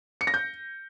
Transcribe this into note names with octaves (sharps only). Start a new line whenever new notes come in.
C#7
A#6
G6